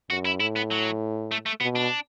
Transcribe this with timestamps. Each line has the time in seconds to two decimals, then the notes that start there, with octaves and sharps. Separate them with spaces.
0.10 F#2 F#4
0.25 E4
0.40 A2 E4
0.56 B3
0.71 F#3
1.32 A3
1.46 A3
1.60 B2 B3
1.76 D4